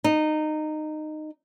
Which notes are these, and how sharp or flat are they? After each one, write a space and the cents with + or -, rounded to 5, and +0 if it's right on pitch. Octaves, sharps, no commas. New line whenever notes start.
D#4 -20